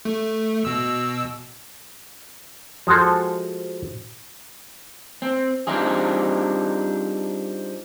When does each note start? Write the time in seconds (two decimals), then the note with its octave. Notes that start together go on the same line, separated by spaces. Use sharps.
0.05 A3
0.65 B2 E6
2.87 F3 G#3 F#4 A4 C5
5.22 C4
5.67 G3 C4 D4 D#4 F4 G#4